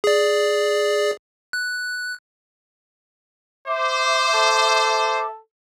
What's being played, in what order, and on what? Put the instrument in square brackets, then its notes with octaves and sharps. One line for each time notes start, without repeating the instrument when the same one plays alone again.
[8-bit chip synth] G#4 D5
F#6
[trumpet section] C5 [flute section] E5 D6
[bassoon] A4